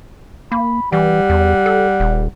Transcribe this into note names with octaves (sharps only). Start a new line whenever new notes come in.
A#3 B5
E3 G3 F#5
E2
A4
D#1